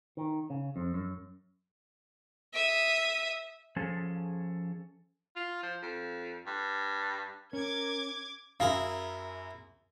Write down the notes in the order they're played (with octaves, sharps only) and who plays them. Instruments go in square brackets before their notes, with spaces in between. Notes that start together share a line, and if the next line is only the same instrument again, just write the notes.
[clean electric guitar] D#3
C#3
F2
F#2
[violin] E5 D#6
[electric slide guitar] F3 C#4 G#4 A4
[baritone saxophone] F4
F3
F2
G2
[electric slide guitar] C#4 [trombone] A#4 [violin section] D6 G#6
[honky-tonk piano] F#2 [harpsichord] E4 G#4 A#4 [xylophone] F5